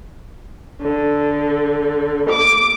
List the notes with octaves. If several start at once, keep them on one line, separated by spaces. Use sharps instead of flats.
D3
D6